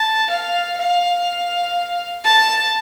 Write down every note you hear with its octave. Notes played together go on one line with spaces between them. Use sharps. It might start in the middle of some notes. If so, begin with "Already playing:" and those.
Already playing: A5
F5
F5
A5